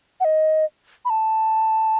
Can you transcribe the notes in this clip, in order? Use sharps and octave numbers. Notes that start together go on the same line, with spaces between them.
F#5
D#5
B5
A5